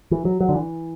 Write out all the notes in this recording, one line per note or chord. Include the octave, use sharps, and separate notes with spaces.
E3
F#3
F#3
D3
E3